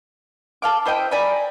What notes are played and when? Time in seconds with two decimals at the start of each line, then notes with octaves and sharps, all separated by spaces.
0.62 A4 F5 D6
0.85 E4 C5 D#5 G5
1.11 D5 G#5 A#5 B5